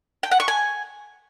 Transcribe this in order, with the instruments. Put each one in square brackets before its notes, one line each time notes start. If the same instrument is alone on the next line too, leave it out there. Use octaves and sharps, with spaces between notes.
[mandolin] G5
F#5
C#6
G#5